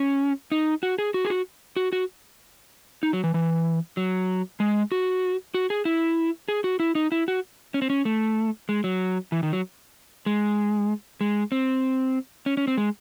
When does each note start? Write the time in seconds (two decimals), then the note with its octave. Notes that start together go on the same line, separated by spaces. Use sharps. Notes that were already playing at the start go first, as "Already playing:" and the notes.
Already playing: C#4
0.52 D#4
0.83 F#4
0.98 G#4
1.14 F#4
1.25 G#4
1.30 F#4
1.76 F#4
1.93 F#4
3.03 D#4
3.13 F#3
3.24 E3
3.34 E3
3.97 F#3
4.60 G#3
4.92 F#4
5.54 F#4
5.70 G#4
5.85 E4
6.48 G#4
6.64 F#4
6.80 E4
6.95 D#4
7.12 E4
7.28 F#4
7.74 C#4
7.82 C4
7.90 C#4
8.05 A3
8.69 G#3
8.84 F#3
9.32 E3
9.43 D#3
9.53 F#3
10.26 G#3
11.21 G#3
11.52 C4
12.46 C#4
12.57 C#4
12.67 C4
12.77 G#3